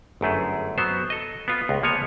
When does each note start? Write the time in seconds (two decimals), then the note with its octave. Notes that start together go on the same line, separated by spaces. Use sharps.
0.21 G1 F#2 A3 G#4
0.78 F#3 B3 C5
1.10 A4 D#5
1.48 B3 F4
1.69 C#2
1.83 F3 A#3 B3 C#5 G#5